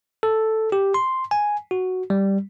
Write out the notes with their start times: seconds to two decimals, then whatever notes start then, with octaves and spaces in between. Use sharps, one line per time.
0.23 A4
0.72 G4
0.94 C6
1.31 G#5
1.71 F#4
2.10 G3